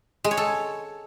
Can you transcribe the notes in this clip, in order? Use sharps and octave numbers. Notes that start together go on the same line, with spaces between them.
G#3
C#5
A4